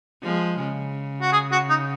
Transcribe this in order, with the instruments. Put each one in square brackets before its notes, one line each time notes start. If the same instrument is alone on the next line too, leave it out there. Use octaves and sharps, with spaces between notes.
[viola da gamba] F3 G#3
C#3
[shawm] F#4
G#4
F#4
D#4